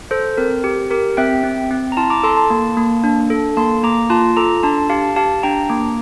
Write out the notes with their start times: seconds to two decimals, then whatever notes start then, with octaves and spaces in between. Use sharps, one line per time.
0.11 A4 C5
0.37 C4 A#4
0.64 G4
0.91 G4 A#4
1.17 C4 E5 G5
1.44 C4
1.71 C4
1.92 A#5
1.97 E4 A5 C6
2.10 A#5 D6
2.23 A4 A5 C6
2.37 A5 C6
2.50 A#3
2.77 A#3
3.04 D4
3.30 A4
3.57 A#3 A5 C6
3.83 A#3 A#5 D6
4.10 F4 A5 C6
4.37 A4 A#5 D6
4.63 D4 A5 C6
4.90 G4 F5 A5
5.16 G4 F5 A5
5.43 D4 G5 A#5
5.69 A#3 A#5 D6